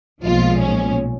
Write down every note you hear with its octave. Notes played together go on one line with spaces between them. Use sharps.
B1 A#2 F3 G#3 F4
C#4